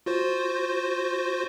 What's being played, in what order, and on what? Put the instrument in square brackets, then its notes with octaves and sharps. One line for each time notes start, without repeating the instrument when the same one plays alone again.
[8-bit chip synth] F4 F#4 C5